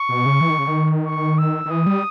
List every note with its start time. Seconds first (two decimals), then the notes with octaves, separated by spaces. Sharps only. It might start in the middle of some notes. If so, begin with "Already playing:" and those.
Already playing: C#6
0.09 B2
0.26 C#3
0.41 E3
0.50 D#3
0.59 C#3
0.68 D#3
1.06 C#6
1.39 E6
1.65 D#3
1.70 E3 D#6
1.86 G3